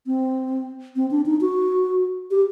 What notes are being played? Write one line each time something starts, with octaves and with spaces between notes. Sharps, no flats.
C4
C4
D4
D#4
F#4
G4